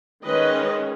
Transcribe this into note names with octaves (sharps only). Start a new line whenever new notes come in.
D#3 G#3 C#4 B4 D#5